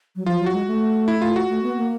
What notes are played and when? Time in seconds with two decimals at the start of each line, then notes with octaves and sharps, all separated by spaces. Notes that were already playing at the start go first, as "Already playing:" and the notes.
0.16 F#3
0.26 F3 F4
0.40 F#3
0.46 F#4
0.53 G#3
0.67 A3
1.08 E4
1.22 F4
1.36 F#4
1.49 A3
1.63 B3
1.76 A#3